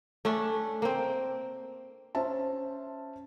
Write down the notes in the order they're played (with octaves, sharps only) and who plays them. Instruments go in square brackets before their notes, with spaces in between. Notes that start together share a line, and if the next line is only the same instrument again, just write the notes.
[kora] A3 C#4 D4
A#3 C4
[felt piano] C#4 C5 E5 A5